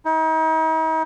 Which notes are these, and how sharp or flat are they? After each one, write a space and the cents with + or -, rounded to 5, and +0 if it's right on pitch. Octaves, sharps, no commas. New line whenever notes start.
D#4 +40